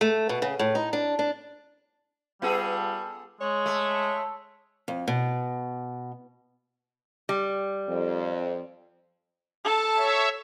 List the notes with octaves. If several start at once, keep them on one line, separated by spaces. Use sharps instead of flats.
A3
B2
C#3
A2
D#4
D4
D4
G3 B3 F4 G#4 A4
G#3 C#5
A3
F2
B2
G3
F2
A4 A5
C#5 E5